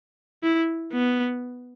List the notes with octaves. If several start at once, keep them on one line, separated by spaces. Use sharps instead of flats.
E4
B3